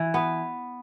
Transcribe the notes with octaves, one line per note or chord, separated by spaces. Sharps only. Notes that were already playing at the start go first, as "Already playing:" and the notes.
Already playing: E3
B3